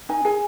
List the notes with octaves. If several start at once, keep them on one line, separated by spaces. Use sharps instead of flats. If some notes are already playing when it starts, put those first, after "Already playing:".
D#4 G#5
G#4 G#5